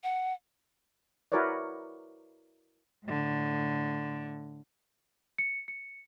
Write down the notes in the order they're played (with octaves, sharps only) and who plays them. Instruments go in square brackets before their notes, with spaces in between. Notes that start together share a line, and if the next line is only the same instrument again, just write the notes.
[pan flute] F#5
[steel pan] E4 F#4 A#4 B4 C#5 D5
[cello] A2 D3
[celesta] C#7
C#7